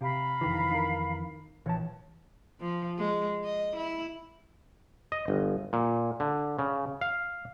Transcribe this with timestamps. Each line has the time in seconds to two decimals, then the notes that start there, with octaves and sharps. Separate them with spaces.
0.01 C3 G4 F5 A#5 B5
0.41 F2 D#3 E3
0.70 D#4 A#4
1.66 A#1 E3 C#5 A5
2.61 F3
2.99 G#3
3.44 D#5
3.76 E4
5.12 D#5
5.28 G1
5.73 A#2
6.20 D3
6.59 C#3
7.01 F5